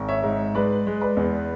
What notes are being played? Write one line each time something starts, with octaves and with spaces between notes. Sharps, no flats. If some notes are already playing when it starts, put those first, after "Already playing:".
Already playing: G#1
C#5 E5
G#2
G#3 B4 D5
G#3
B4 D5
E2